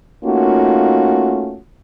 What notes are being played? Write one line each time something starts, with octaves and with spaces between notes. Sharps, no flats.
A3 A#3 C#4 D#4 F4 F#4